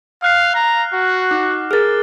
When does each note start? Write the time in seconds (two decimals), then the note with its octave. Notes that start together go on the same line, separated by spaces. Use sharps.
0.22 F5 F6 F#6 C7
0.55 A#5
0.94 F#4
1.31 D#4 D6
1.71 G#4 A#4 F6 A6